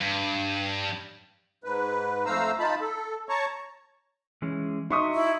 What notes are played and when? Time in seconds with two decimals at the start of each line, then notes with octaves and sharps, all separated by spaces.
0.01 G2
1.64 G#2 B4
2.25 F2 A3 C5 F5 A#5 E6
2.59 D#4 F4 A5 B5
2.81 A4
3.29 C#5 A5 A#5 C#6
4.42 E3 G#3 C#4
4.91 D#4 F#4 E5 C6 C#6 D#6
5.14 E4